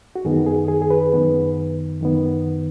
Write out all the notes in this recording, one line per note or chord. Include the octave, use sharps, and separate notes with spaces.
F#4
F#2 D#3 B3 G#4
G#4
G#4
G#4
B4
F#2 D#3 B3
F#2 D#3 B3